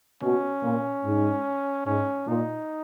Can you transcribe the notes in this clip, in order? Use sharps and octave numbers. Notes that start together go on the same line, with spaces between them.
B2 C#4
A#2
G#2
G#2 C#4
A#2 D#4